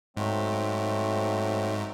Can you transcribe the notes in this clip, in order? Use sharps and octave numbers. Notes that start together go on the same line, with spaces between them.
G#2 F#3 A3 C4